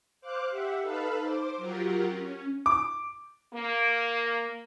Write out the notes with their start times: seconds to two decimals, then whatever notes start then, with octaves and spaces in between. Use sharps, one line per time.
0.21 C5 F5 D6 F#6
0.50 G4 E5 F#5
0.81 D#4 A4 B4 F5 A5 B5
1.20 C5 D6
1.57 F#3 F4 G4 A#4 F#5
2.08 C#4
2.66 D6
3.54 A#3